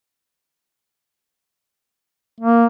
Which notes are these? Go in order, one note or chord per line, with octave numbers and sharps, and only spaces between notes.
A#3